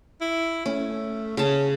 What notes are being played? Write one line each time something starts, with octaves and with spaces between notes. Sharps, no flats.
E4
A3 C#4
C#3 C#4 A5